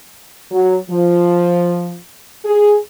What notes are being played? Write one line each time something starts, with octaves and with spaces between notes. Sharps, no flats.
F#3
F3
G#4